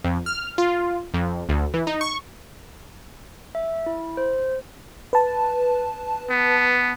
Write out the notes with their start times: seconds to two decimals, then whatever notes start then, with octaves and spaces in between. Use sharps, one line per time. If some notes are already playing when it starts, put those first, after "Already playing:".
0.04 F2
0.26 F6
0.58 F4
1.14 F2
1.49 D2
1.74 E3
1.87 D#4
2.01 C#6
3.55 E5
3.86 E4
4.17 C5
5.13 B4 A5
6.30 B3